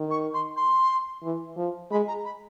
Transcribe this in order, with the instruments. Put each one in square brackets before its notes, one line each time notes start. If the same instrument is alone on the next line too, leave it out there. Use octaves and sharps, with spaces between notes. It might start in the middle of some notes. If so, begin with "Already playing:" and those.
Already playing: [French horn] D#3
[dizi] C#6
C6
C6
[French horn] E3
F3
[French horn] G#3 [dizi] B5
[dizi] A#5
B5